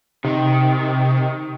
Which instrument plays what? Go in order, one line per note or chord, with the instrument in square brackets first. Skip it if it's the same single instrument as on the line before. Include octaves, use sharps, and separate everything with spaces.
[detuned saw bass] C3 [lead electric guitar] D#3